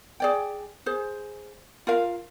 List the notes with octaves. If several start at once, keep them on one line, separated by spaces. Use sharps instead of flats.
G#4 D5 G5
G#4 C5
F4 A#4 F5